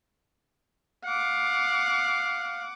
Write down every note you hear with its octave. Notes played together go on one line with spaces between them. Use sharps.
F5 F#5 D6